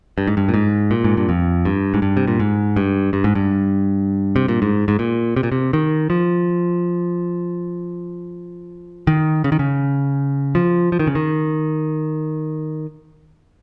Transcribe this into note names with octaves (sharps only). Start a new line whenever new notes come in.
G2
G#2
G2
A#2
G#2
A#2
G#2
G2
F2
G2
G#2
G2
C3
A#2
G#2
G2
G2
G#2
G2
C3
A#2
G#2
G#2
A#2
C3
A#2
C3
D#3
F3
D#3
C#3
D#3
C#3
F3
F3
D#3
C#3
D#3